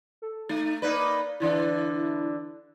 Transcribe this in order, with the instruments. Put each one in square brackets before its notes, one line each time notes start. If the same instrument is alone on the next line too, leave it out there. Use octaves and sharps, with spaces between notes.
[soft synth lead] A4
[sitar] A3 [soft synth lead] D#4
[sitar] A#3 D#4 B4 [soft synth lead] D5
[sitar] D3 E3 D4 [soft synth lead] E4